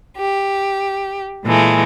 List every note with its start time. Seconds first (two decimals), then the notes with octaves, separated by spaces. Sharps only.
0.17 G4
1.45 A#2 E3 G#3 A3